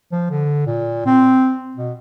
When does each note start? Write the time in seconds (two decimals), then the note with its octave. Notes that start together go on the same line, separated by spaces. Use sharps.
0.12 F3
0.31 D3
0.66 A#2
1.06 C4
1.77 B2